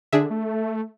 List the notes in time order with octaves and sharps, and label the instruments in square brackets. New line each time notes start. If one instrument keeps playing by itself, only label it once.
[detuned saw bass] D3 [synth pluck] D4 G#4 E5
[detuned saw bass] A3